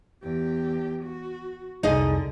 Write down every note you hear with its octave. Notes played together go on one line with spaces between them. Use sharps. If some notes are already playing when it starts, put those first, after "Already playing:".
E2 G4
F#4
C2 F2 D3 D#4 G#4 D#5